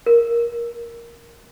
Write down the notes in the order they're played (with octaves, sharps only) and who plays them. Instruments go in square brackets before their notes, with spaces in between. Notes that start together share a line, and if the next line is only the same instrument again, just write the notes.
[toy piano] A#4